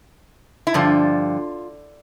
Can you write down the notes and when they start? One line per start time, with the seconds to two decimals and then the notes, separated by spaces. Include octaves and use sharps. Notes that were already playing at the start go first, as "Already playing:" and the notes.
0.67 E4
0.74 G2 D3 F3 F4